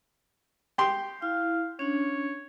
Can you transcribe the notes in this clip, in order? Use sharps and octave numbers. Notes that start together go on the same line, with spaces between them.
G4 G5 C6
E4 F5
C#4 D4 C#5